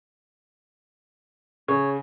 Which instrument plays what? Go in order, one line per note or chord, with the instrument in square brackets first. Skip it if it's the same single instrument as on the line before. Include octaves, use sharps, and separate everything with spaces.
[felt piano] C#3 [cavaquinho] C#5